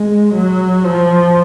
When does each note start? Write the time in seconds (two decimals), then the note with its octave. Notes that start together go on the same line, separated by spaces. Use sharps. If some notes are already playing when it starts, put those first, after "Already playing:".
Already playing: G#3
0.35 F#3
0.85 F3